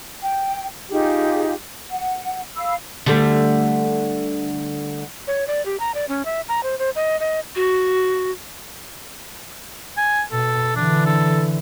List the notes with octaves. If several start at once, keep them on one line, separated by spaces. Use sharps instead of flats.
G5
D#4 F4 G4 G#4
F#5
F5 B5 E6
D3 G3 A3
C#5
D5
G4
A#5
D5
C#4
E5
A#5
C5
C5
D#5
D#5
F#4
G#5
B2 A4
D3 E3 D4
A4